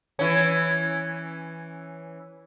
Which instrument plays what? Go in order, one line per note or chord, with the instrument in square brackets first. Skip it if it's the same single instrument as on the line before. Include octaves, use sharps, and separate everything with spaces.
[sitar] E3 C#4